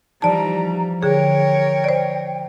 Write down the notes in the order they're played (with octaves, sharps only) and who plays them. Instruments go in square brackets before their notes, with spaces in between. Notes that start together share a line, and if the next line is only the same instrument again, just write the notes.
[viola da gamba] E3 G3 [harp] F3 D#4 [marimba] D5 A5 [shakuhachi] A#5
[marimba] D3 G#4 [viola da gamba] A#4 C#5 [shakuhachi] G5
[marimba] C5 D5